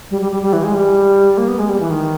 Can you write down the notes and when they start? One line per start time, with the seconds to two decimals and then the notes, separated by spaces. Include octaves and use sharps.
0.11 G3
0.21 G3
0.32 G3
0.42 G3
0.53 E3
0.64 G#3
0.74 G3
1.38 A#3
1.48 B3
1.59 G#3
1.69 G3
1.80 E3
1.90 D#3